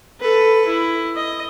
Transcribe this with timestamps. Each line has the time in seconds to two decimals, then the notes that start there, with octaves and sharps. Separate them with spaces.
0.21 A4 B4
0.67 E4
1.16 D#5